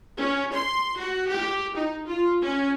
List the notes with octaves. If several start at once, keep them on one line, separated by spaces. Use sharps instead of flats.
C#4
C6
F#4
G4
D#4
F4
C#4